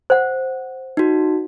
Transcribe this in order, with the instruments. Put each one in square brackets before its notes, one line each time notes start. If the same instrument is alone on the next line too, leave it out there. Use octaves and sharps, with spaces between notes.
[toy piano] C5 F#5
[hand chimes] D#4 F#4